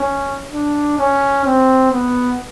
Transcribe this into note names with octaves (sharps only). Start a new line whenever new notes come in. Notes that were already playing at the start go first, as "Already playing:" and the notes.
Already playing: C#4
D4
C#4
C4
B3